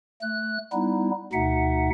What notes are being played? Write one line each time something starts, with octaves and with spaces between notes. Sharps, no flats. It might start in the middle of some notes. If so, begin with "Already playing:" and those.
A3 F#6
G3 B3 D#4 E4
D2 B2 D#4 E5 F#5